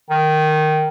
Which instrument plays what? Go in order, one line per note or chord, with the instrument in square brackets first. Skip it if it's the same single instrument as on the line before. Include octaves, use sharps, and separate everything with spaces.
[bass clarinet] D#3